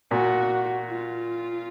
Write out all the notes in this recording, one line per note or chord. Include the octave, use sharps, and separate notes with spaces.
A#2 F#4
F4